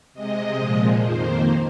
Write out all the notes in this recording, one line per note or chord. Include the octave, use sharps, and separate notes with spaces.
C3 G#3 D#5
A#2 F3 G#3
F2 D#3 A#3 C5